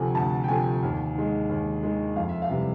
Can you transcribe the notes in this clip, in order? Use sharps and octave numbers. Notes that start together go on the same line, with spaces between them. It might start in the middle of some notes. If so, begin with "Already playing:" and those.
Already playing: D2 C3 F3 A3 F#5 G#5
D2 A5
G5
C3 F3 A3 G#5
D#2
D#3 G#3
D#2
D#3 G#3
F2 F5
E5
F5
C3 E3 G3